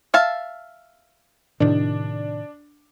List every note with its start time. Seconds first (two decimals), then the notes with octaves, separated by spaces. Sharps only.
0.14 E5 F5 A5
1.60 A2 C3 D#3 D4